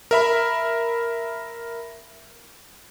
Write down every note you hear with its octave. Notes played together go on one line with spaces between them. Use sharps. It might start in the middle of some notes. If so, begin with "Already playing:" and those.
A#4 E5 B5